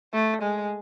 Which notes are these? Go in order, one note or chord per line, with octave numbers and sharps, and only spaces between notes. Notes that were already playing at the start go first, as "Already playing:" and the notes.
A3
G#3